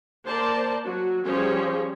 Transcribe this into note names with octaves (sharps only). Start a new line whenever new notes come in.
A#3 A#4 C5 D5 A5 C6
F#3 F#4
F3 G3 C#4 G#4 C5 C#5